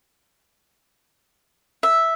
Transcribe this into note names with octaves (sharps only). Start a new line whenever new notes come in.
E5